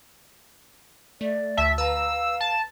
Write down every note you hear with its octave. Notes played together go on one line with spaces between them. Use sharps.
A3 D5
D2 E5 A5
B4 F5 A#5 E6
A5